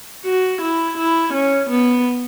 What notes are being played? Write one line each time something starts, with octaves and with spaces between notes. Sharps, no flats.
F#4
E4
E4
C#4
B3